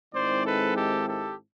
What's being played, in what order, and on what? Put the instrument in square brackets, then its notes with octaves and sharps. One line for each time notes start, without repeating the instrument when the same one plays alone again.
[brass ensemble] G#2 D#3 G#3 C4 E4 C5 D5
A4 B4
G4 A4
G4 A4